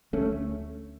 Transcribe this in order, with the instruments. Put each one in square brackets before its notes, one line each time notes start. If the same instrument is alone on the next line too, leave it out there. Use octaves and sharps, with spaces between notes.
[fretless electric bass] D2 A3 C#4